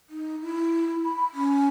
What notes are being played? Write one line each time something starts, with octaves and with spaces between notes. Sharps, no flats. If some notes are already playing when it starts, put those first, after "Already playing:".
D#4
E4
B5
C#4